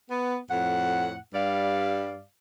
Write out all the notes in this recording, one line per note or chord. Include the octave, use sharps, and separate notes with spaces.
B3
F2 A2 F#5
G2 G3 D5 F5